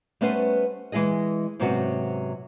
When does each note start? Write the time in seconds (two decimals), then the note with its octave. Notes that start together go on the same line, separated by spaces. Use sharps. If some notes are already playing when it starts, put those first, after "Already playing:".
0.21 G3 A3 B3 C#4 B4 C5
0.92 E3 G#3 E4 G#4 D#5
1.60 G#2 C3 F#3 B3 C#4 F#4